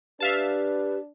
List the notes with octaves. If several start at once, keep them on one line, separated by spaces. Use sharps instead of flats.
D4 G4 B4 E5 F5 A5